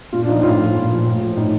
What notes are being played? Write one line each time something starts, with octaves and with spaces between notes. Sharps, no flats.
A#2 F4
D4
F3 D#4
A2 F4
F3
A#2
F3
A2
F3
A2 D#4